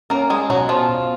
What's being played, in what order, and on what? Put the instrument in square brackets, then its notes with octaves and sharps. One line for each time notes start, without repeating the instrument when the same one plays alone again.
[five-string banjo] A#3 A#4 [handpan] C#4
[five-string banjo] G#3 G#4
[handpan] B2 [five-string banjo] F#3 F#4
[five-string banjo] F3 F4
[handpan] B2